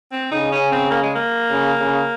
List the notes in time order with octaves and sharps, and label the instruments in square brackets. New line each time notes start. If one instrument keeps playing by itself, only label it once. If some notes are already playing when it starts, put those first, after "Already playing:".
[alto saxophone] C4
[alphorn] C#3 [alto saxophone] D#4
[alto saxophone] C#4
C4
A#3
G#3
A#3
[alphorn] C#3
C#3